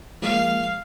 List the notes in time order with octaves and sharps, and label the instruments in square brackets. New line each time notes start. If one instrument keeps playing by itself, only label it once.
[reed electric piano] F3 G#3 A#3 [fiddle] F5